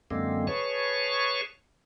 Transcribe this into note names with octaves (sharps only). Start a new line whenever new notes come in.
F#2 D3 G#3 A#3 C4
G#4 B4 C#5 A5 C#6